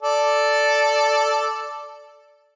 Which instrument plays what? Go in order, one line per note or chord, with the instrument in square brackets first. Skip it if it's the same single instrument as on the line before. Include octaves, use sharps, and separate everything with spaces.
[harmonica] A4 D5